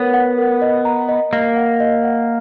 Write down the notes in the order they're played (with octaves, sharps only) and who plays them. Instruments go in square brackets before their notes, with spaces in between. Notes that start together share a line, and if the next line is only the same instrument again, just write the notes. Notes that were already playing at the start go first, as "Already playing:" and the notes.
Already playing: [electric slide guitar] B3 [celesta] A#4 C#5
[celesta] F#5
A#4
D#5
A#5
D#5
[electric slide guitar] A#3 [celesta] D#5
[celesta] F#5
D#5
F#5